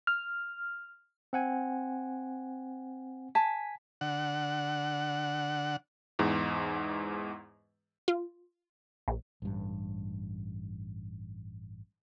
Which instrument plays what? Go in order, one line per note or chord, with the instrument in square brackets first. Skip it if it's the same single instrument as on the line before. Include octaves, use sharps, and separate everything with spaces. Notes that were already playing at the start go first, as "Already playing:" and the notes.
[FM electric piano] F6
[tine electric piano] C4 F#5 G#5
[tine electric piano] G#5 B6 [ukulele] A5
[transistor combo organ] D3 F#5
[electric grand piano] E2 G#2
[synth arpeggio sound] F4
A#1
[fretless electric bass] A1 G2